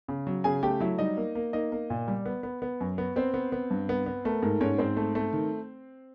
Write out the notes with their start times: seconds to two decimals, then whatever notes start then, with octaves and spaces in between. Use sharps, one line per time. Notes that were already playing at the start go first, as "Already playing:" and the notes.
0.08 C#3
0.27 F#3
0.44 C#3 G#4 G#5
0.63 A3 G4 G5
0.80 F#3 E4 E5
0.98 G3 D#4 D#5
1.17 A#3
1.35 A#3
1.53 A#3 D#4 D#5
1.72 A#3
1.90 A#2
2.08 G3
2.26 B3
2.43 B3
2.62 B3
2.81 F#2
2.98 B3
3.16 B3 C4 C5
3.34 B3
3.52 B3
3.71 G2
3.89 B3
4.06 B3
4.25 A3 A#4
4.42 G#2 A#4
4.61 G#2 C#4 C#5
4.78 G#2 C4 C5
4.97 A3
5.15 A3
5.33 D#3